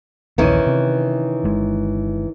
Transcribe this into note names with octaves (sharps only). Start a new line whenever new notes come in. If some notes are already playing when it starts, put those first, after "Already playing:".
A#1 D#2 D#3 E3 C#4
C3
G1 G#3